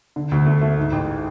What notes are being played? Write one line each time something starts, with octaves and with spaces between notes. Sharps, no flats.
D3
D2
A3
A3
G#2
A1